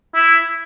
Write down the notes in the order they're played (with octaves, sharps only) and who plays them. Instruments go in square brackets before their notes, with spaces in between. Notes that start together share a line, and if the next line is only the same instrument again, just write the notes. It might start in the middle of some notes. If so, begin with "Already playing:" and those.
[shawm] E4